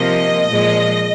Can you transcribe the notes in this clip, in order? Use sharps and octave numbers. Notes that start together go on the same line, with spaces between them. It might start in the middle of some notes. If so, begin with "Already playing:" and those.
Already playing: C3 F3 A#3 D#5
A#2 F3 G#3